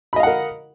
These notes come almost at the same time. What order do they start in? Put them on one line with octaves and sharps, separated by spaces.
B5 D#5 F5 F#5 A#4